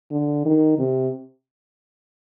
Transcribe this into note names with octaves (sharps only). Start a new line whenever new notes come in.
D3
D#3
C3